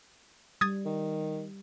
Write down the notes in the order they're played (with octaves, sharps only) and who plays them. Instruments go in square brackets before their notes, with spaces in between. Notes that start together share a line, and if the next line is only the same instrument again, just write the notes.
[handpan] G3 [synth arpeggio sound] D#6 G#6 A6
[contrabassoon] D#3